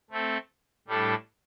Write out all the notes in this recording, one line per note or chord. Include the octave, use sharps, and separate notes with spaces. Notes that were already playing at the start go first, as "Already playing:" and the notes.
A3 C4 A4
A2 G3 D4 A4